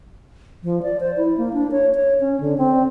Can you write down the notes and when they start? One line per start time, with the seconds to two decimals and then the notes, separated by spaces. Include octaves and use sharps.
0.64 F3
0.83 D5
1.00 C5
1.17 E4
1.37 A#3
1.53 D4
1.71 C#5
1.95 C#5
2.20 C#4
2.40 D3
2.58 C4